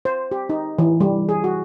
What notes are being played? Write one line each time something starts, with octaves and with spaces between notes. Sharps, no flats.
C5
G4
D#4
E3
G3
G#4
F#4